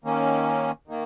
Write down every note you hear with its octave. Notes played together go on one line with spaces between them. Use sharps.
D#3 A#3 C#4
D#3 A#3